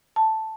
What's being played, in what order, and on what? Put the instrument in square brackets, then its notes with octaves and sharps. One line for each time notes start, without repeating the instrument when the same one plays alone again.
[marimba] A5